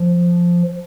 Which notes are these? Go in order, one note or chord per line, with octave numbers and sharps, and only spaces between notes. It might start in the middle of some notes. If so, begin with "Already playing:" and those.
Already playing: F3